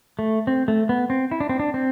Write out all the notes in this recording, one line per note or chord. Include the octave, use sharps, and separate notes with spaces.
A3
C4
A3
B3
C4
E4
D4
C4
D4
C4